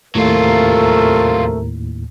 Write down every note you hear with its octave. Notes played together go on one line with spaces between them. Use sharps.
D#2 A2 C3 F#3 A3 F4 A#4